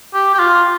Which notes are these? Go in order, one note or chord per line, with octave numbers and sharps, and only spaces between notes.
G4
G4
F4